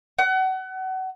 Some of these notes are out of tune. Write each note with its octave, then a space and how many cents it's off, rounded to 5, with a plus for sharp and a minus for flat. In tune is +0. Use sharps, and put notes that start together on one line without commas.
F#5 +30